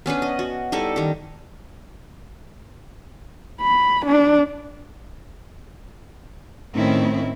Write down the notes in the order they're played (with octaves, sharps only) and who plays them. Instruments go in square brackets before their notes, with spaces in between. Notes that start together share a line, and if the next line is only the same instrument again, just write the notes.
[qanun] B3 C#4 D4 B4
D#5
F#4
G3 D#4 E4 A4
D#3 G4
[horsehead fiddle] B5
D4
[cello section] A2 D#3 C4 C#4 E4